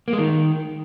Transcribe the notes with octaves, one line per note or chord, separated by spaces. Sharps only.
A#3
G#3
D#3